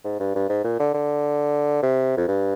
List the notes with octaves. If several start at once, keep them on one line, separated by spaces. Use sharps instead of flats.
G#2
G2
G2
G#2
A#2
D3
D3
C3
F2
G2